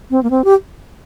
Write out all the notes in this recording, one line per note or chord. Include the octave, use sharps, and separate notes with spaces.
C4
A#3
C4
G4